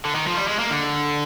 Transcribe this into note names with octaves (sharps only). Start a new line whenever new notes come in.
D3
D#3
F3
G3
G#3
A#3
D3